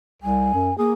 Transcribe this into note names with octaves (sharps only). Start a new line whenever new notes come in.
C2 G#5
F#2
A#3 G#4